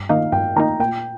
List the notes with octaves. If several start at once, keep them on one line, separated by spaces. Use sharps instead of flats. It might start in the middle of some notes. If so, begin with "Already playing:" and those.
Already playing: G2
D#3 A#3 D#4 F5
G2 G5
D#3 A#3 D#4 A#5
A#2 G5